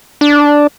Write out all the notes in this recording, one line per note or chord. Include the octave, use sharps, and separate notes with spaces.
D4